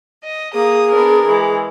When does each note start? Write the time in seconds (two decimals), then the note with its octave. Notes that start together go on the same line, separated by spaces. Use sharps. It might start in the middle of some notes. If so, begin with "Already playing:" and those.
0.24 D#5
0.53 A#3 G#4 D#6
0.91 B3 D4 A#4
1.27 E3 G#3